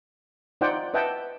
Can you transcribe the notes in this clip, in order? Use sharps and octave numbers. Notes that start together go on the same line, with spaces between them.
D#4 F4 C5 D5 F#5 G5
B4 D#5 E5 F#5 G5 A5